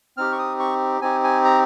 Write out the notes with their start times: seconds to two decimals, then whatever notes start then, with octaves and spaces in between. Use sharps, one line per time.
0.17 C4 D#4 G4 F6
0.32 C#6
0.38 D#6
0.60 C#6
1.01 C4 D#4 G4 G#5
1.24 G#5
1.45 A#5